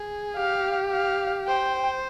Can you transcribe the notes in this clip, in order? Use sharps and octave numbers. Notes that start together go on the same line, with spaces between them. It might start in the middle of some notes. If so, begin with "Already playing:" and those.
Already playing: G#4
G4 F5
F5
C5 G5